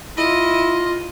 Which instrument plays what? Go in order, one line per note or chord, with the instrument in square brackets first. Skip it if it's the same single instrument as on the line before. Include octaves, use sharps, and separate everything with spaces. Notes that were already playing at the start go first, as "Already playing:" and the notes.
[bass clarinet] E4 [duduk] F4 [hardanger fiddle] D#5